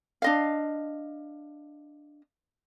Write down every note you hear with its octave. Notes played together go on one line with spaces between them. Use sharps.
D4 D#5 F5